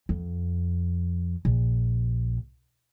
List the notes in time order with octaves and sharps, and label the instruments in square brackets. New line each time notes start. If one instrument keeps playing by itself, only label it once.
[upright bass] F2
A#1